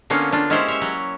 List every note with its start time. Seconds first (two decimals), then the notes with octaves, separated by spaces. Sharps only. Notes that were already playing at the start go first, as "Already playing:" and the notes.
0.10 D3 A#3 B3 C#4 F4
0.32 D4 F4
0.50 G#3 C#4 E4 G4 C5
0.68 C#5 E5
0.82 F#3